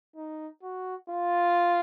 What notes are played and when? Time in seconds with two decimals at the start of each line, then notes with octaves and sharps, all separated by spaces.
0.16 D#4
0.63 F#4
1.10 F4